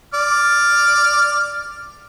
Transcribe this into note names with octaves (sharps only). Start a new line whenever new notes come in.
D5 F6